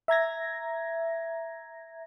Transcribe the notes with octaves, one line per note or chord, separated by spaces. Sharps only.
E5 A#5 G#6 A#6